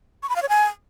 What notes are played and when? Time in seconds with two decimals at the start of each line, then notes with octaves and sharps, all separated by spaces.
0.23 C#6
0.29 B5
0.36 F5
0.42 C#5
0.49 G#5